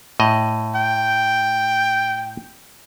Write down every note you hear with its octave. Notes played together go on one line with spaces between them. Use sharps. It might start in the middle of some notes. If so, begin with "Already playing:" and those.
A2 D#5
G5